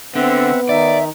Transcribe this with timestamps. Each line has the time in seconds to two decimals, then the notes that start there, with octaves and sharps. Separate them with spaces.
0.16 D3 B3 C4 E5 F#5
0.69 D#3 D#4 D5 E5